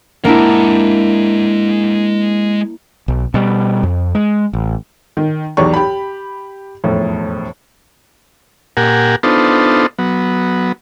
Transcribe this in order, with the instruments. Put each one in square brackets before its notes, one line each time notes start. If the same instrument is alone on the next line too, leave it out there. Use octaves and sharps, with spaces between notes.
[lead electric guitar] G#3 F#5 [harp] A#3 D4 E4
[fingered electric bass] B1
B2 G3
F2
G#3
A1
[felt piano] D#3
B1 E2 G4 D5 C#6
G4 B5
E1 F2 A2
[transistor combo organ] A#2 G4 A#4 F#5 G#5
B3 D4 D#4 F4 A4 C5
F#3 B3